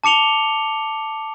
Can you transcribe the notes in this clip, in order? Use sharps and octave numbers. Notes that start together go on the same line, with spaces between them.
A5 D6 C#7 F7 G7